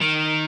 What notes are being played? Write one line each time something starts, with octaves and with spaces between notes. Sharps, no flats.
D#3